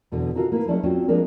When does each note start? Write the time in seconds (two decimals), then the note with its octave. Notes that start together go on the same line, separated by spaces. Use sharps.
0.12 E2 B2 D3 E3
0.35 D#4 F4 F#4 A4 A#4 F5
0.52 A#3 E4 B4
0.68 F#3 G#3 C#4 E4 D5 A5
0.83 C4 C#4 F4 F#4 C#5
1.08 F3 G#3 A#3 C4 D4 A#4